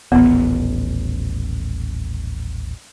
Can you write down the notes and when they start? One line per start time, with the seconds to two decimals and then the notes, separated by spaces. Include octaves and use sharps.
0.12 D#1 A1 B3